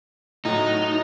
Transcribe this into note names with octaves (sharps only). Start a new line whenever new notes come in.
A2 F#3 D#4